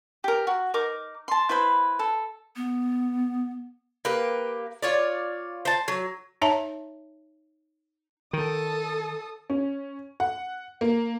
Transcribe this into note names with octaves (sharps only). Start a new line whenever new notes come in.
G4 A#4
F#4
D#4 A#4 D6
A5 C6
E4 B4 C5 B5
A4
B3
A#3 G4 B4
F4 C#5 D5
C5 A5
F#3
D#4 C#5 E5 A5 A#5
D#3 A4 D#6
C#4
F#5
A#3